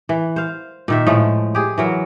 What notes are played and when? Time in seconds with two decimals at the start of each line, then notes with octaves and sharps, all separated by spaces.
0.09 E3
0.36 C5 F5
0.88 A#2 D#3 E5
1.07 A2 F3 G#3 A3
1.55 G4 G#4
1.78 E3 F#3 A#4